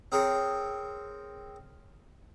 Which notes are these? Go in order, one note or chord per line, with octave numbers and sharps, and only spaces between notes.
C4 G#4 A#4 C#5